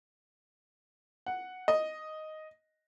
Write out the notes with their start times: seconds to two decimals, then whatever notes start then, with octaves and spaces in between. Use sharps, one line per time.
1.26 F#5
1.68 D#5